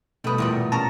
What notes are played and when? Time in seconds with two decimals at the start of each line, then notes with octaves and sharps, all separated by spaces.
0.24 B2 G3 A3 B4 D#6
0.38 E2 A#2 G3
0.72 C#4 A#4 A5 A#5